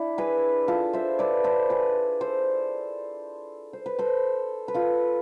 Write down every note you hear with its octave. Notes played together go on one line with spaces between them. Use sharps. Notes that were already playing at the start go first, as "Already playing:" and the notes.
Already playing: D4 E4
G#4 B4
F4 A4
C5 E5
B4 D5
A4 C5
G#4 B4
A4 C5
C5
B4
A4 C5
B4
F4 A4